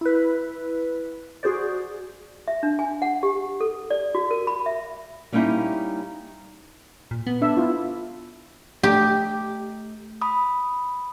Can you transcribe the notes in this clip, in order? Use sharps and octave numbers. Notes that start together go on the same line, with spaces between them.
E4 B4
F#4 G#4 C5 D5
E5
D4
G#5
F#5
G4
A4
D5
F#4
A#4
B5
E5
G3 A#3 C#4 D#4 E4 G4
A#2
B3
D4 E5
E4 F4
A3 G4
B5 D#6